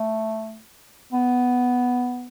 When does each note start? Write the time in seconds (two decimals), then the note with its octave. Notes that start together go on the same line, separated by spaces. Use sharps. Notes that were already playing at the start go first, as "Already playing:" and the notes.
Already playing: A3
1.13 B3